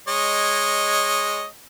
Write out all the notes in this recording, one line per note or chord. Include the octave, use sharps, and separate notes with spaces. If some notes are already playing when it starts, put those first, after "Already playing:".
G#3 C#5 D#5